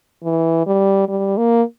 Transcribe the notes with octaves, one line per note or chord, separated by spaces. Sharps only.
E3
G3
G3
A#3